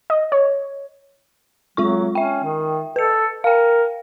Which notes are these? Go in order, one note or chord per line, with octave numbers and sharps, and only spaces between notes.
D#5
C#5
F#3 G#3 F4 C#6
C#4 E5 G5
D#3
A4 B4 C#7
A#4 F5 G5